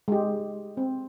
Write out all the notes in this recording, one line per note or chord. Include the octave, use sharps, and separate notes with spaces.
G#3 G4
C4